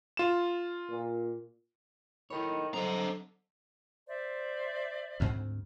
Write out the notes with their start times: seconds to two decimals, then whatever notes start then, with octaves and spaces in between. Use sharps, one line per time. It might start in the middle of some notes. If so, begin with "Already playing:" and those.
0.17 F4 E7
0.90 A#2
2.30 D#3 D#4 E4 A4 C#5 B5
2.74 D3 F#3 C4 D4 C5 D#5 A#5
4.07 C5 D5 E5
5.20 D2 G#2 C4